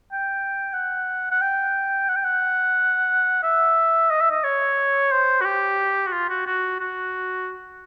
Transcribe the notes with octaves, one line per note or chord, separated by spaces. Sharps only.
G5
F#5
F#5
G5
F#5
G5
F#5
E5
D#5
E5
D#5
C#5
C5
F#4
G4
F#4
F4
F#4
F#4
F#4